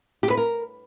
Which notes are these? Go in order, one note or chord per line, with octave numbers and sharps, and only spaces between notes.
G4
B4
A#4